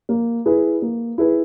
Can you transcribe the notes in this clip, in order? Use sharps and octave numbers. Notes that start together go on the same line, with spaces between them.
A#3
E4 G#4 B4
A#3
E4 G#4 B4